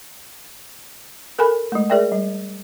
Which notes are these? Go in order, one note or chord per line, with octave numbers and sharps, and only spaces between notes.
A4 A#4 G#5 B5
G#3 A3
G#4 A#4 D5 E5 G5
G3